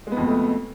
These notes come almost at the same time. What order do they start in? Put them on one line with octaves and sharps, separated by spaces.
G#3 B3 F2 B2 A3